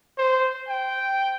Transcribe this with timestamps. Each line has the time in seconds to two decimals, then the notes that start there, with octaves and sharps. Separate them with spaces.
0.18 C5
0.68 G5